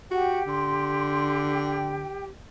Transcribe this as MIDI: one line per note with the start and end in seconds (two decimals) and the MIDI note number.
0.11 0.40 66
0.11 2.29 67
0.11 0.44 78
0.11 0.44 79
0.47 2.14 50
0.47 1.36 84
1.52 2.24 79